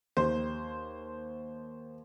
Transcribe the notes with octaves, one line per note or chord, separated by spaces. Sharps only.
D#2 C5 C6